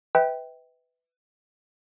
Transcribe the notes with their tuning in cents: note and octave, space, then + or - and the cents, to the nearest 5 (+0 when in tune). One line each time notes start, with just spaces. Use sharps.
B4 +15 E5 -35 G5 +0